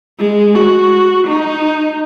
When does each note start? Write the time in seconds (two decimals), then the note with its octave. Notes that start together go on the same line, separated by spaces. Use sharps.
0.19 G#3
0.55 F#4
1.28 D#4